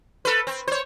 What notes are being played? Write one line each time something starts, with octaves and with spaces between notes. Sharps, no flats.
A4 B4
C4
C5 C#5